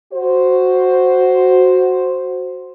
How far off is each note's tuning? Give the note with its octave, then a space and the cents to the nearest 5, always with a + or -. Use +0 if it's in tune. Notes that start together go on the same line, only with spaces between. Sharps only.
F#4 +0 C5 +0